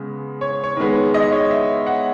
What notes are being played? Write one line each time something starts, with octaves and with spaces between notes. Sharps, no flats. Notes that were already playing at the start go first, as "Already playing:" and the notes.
Already playing: C#3 G#3 B3
C#5
C#5
D#3 G#3 B3
D#5
C#5
E5
F#5